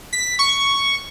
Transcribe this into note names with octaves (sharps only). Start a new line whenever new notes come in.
B6
C#6